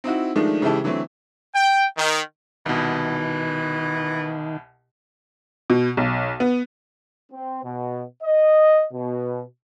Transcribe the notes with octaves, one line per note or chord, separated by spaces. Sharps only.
C4 D#4 E4 F#4
D#3 F3 G#3 A3 D4 D#4
C#3 E3 G#3 E4 G4 A4
D3 E3 F#3 A3 C4
G5
D#3
C2 B2 D#3 E3
B2
B1
B3
C4
B2
D#5
B2